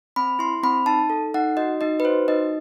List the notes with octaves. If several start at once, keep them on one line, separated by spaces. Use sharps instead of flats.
C4 B5
E4 C6
C4 B5
D#4 A5
A4
D#4 F#5
F#4 D#5
D#4 D#5
B4
F#4 C5
D#4 D#5